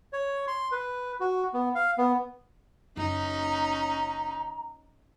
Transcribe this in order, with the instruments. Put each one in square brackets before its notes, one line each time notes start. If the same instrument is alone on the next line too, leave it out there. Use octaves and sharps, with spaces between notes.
[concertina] C#5
C6
B4
F#4
B3
F5
B3
[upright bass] F#1 [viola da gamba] C#4 D#4 [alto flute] A#5